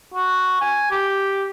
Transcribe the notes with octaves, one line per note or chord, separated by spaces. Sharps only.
F#4
G#5
G4